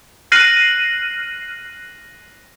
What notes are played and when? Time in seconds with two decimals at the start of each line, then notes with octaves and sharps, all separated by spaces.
0.32 F6 F#6 A#6 C7 D#7 F#7